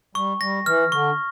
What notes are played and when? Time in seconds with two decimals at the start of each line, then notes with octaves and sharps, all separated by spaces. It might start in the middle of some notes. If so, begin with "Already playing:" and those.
0.15 G3 C#6
0.41 G3 A#6
0.66 E3 F6
0.92 D3 C#6